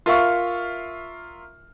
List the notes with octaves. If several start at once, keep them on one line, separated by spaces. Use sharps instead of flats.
F4 A#4 E5 F5 C#6 F6